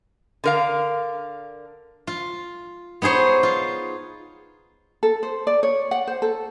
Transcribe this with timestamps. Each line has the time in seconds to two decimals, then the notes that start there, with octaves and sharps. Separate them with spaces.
0.44 D3 A#4 F5
2.07 F4
3.02 B3 D#4 G#4 C5 C#5
3.43 F4
5.03 A4
5.23 C5
5.47 D5
5.63 C#5
5.91 F#5
6.07 C5
6.22 A4